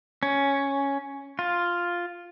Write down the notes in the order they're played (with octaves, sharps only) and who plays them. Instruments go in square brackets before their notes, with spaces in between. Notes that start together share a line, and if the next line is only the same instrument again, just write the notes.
[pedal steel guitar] C#4
F4